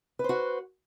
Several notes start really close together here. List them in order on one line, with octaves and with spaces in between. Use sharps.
B4 C5 F#4